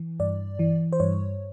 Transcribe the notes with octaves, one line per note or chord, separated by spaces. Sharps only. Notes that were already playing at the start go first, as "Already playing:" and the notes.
Already playing: E3
G2 D5
E3
C5
G2 C#5